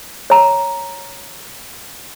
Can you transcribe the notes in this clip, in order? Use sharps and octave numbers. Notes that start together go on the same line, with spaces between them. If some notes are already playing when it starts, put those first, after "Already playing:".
C#5 A#5